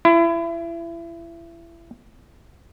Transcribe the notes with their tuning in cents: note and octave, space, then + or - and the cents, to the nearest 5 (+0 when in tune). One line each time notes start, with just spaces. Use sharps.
E4 +30